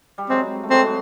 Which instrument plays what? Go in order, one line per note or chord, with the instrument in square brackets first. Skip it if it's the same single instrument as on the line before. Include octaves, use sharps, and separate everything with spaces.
[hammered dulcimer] G3
[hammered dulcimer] F#3 G#3 [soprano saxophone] C4
[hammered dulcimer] A3
[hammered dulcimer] F#3 G#3 [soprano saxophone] C4
[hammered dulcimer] F#3